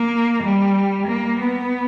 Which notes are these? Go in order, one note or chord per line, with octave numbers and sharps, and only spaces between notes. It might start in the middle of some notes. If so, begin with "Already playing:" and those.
Already playing: A#3
G3
A#3
B3